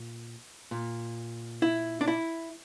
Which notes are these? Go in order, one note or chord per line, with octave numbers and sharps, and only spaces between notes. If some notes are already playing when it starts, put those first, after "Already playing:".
Already playing: A#2
A#2
E4
D4
E4